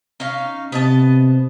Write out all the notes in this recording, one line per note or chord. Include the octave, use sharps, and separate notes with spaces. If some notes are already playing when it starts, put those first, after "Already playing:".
C#4 D#4 F5
C3 B3 D#5 A5